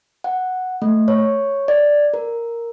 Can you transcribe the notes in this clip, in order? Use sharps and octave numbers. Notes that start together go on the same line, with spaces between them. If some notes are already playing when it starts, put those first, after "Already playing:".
F#5
A3
C#5
D5
A#4